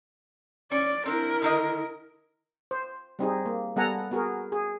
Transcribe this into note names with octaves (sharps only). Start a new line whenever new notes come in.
C#4 D5
C4 D4 E4 A#4
D3 D#3 D#5
C5
G3 C4 D#4 G#4
A#3
G3 B3 A4 F#5 G#5 A#5
B3 F#4 G#4 A#4
G#4